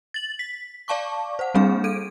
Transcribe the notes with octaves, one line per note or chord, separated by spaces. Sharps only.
A6 F#7
B6
D5 F5 A5 C#6 D6
C5 F#5
G3 A#3 C4 D4 G#4 F5
A4 D7 D#7